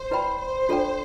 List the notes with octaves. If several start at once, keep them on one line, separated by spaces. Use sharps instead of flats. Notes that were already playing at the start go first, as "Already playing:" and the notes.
Already playing: C5
E4 B4 D5 G5 B5
C5
D4 F4 A4 D5 G5